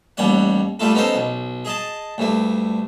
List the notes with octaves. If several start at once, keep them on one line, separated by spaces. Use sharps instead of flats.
A1 D#2 G3 C#5 F#5
G3 A3 F4 A4
B3 C#4 D#4 A4 C5
B1
G#4 D#5 A5
D2 G2 A3